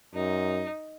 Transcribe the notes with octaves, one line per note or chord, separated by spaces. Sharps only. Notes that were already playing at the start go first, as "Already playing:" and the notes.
F#2 D#4